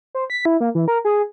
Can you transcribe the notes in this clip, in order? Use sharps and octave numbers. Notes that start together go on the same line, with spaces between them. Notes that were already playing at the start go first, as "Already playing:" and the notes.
C5
B6
E4
A#3
E3
A#4
G#4